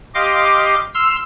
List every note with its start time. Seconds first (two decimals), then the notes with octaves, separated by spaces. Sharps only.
0.15 G4 D#5 F5 C6 D6
0.95 C6 E6 F6